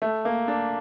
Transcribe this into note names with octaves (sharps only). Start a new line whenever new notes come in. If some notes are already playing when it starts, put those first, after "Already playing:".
A3
A#3
D4